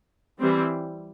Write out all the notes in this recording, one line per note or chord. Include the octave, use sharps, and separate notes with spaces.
E3 G3 C4